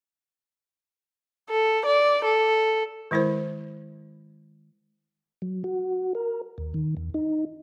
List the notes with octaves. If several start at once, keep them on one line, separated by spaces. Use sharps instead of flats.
A4
D5
A4
D#3 G#3 E4 A#4 C5
F#3
F#4
A#4
D#2
D#3
E2
D#4